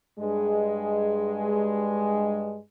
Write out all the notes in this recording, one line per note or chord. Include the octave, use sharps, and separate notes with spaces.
G2 G#3